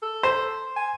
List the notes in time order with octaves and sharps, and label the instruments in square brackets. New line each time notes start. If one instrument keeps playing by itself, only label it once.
[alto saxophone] A4
[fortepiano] C5
[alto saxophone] G#5